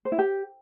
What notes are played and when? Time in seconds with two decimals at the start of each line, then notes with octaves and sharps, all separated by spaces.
0.05 C5
0.12 E4
0.19 G4